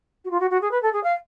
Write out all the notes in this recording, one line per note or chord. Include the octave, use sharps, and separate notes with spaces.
F#4
F4
F#4
F#4
G#4
B4
A4
G#4
F5